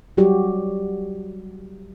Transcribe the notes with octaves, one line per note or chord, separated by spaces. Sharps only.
F#3 G3 F#4 G4